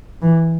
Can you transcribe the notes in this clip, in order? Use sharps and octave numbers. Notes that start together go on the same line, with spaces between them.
E3